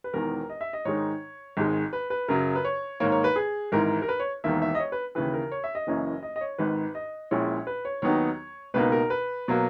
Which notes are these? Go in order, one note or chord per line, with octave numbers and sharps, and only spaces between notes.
B4
E1 E2 D#3 A#4
D#5
E5
D#5
G#2 D#3 G#3 D#4 C#5
G#1 G#2 D#3 G#3
B4
B4
F#2 C#3 F#3 A#4
B4
C#5
G#2 D#3 A#3 C#5
C#5
B4
G#4
G#1 G#2 E3 A#4
A#4
B4
C#5
E1 E2 D#3 A#3 E5
E5
D#5
C#5
B4
D#2 C#3 E3 B4
A#4
C#5
E5
D#5
F#1 F#2 E3 A#3 C#4
D#5
D#5
C#5
G#1 G#2 D#3 B4
D#5
A#1 A#2 G#3 C#4 E4 C#5
B4
C#5
D#2 D#3 F#3 B3 D#4 C#5
C#2 B2 A#3 D#4 B4
A#4
B4
B2 F#3 A#3